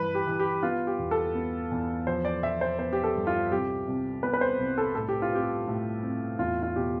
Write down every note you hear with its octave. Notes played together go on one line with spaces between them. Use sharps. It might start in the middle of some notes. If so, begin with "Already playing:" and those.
Already playing: G2 E3 B4
G4
E3
G4
B3 F4
G4
E2
A4
B3
E2
F3 C5
D5
F3 E5
C5
B3 C5
G4
A4
G2
F4
C2 G4
C2
B3 B4
B4
C5
C2
A4
A2 A4
G4
F4
C4 G4
A2
C4
E2 F4
F4
B2 G4